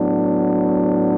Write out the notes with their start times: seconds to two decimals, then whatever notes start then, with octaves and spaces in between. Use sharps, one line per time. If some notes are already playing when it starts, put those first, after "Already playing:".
Already playing: A2 F#3 B3 D4